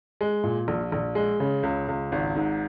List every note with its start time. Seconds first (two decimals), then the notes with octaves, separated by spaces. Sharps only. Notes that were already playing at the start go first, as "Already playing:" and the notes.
0.21 G#3
0.43 A#2
0.68 A#1
0.92 A#1
1.15 G#3
1.40 C#3
1.63 C#2
1.88 C#2
2.12 G#1
2.36 G#2